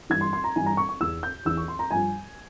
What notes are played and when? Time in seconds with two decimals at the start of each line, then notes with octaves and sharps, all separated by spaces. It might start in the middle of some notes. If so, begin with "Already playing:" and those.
0.10 G2 E3 G#6
0.21 C6
0.33 C6
0.44 A#5
0.56 G2 E3 G#5
0.66 A#5
0.77 C#6
0.89 C#6
1.00 E2 E3 E6
1.23 G6
1.45 E2 E3 E6
1.57 C#6
1.68 C6
1.79 A#5
1.91 G2 F3 G#5